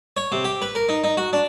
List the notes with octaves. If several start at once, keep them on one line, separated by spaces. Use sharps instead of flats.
C#5
C3
G4
B4
A#4
D#4
D#4
F#4
D4